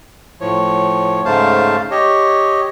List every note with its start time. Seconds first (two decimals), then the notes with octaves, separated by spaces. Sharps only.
0.41 A2 F3 C#5
1.25 G#2 C#3 A3 C5 F5 A5
1.91 G4 C#5 D#5